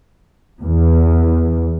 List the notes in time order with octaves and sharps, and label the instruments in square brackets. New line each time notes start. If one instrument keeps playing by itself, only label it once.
[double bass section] E2